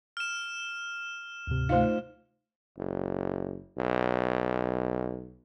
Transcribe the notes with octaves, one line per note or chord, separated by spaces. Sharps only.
F6 E7
D2 G#2 C3
A3 D#4 F4 C5 F5
F#1
B1